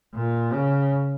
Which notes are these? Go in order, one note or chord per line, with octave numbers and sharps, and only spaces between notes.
A#2
C#3